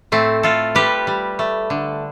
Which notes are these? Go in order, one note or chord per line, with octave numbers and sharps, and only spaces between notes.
A2 A3 C4
A2 F4 A4
G3 G4 B4
G3
A3
D3